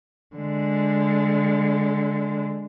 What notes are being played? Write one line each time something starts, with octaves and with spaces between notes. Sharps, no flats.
D3 G#3